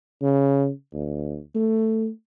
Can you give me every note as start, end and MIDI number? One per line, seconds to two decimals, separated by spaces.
0.22 0.70 49
0.94 1.39 38
1.55 2.09 57